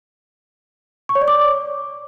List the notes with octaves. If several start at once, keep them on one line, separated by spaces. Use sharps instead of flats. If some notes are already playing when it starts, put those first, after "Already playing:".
C#6
C#5
D5
D6